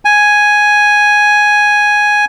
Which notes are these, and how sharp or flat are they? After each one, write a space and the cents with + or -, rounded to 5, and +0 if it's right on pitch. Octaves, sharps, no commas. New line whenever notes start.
G#5 +0